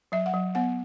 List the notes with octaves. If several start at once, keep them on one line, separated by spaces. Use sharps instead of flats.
F#3 E5
F#5
F#3
B3 F#5